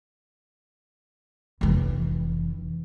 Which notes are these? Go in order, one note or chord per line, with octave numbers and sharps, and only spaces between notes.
F1 E3